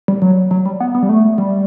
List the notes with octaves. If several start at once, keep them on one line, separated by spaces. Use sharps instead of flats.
G3
F#3
F#3
G3
B3
B3
G3
A3
G3